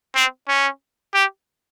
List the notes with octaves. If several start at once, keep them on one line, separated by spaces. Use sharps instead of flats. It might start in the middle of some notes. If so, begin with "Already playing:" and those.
C4
C#4
G4